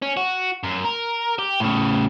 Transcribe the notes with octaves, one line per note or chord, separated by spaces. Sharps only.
C#4
F#4
F#2
A#4
G4
A2 C#3